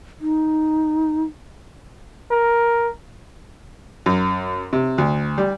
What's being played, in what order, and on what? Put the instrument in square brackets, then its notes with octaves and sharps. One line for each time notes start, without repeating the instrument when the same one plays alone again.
[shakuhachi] D#4
[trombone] A#4
[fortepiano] F#2
C3
D2
G3